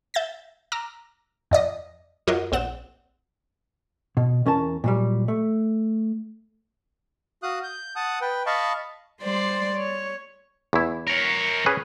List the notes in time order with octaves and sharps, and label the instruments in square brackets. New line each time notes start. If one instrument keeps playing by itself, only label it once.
[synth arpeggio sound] E5 G6 A6 A#6
A#5 D6 E6 F6
F2 D5 D#5 A#6
F#2 F4 F#4 A#4 D#5
A#1 C4 F#5 E7
[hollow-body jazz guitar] B2
E2 C#4 A#4 A5
A#2 F#3 G3
A3
[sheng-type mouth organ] F#4 F5 D#6 F#6
G6
F#5 A5 D#6 F#6
B4 G5
D#5 F5 A5 B5 C#6
[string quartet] G3 C5 D5 C6
C#5
[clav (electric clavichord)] E2 E4
[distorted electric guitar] A#4 C#5
[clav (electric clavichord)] C#4 G#4 B4